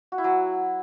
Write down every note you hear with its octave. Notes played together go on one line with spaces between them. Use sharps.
F#4
E4
F#3